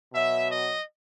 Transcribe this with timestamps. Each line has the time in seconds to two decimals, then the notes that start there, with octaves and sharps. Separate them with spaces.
0.13 B2 F#3 E5
0.51 D#5